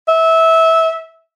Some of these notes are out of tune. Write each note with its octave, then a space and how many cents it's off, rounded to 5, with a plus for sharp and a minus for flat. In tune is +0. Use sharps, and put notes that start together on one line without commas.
E5 -20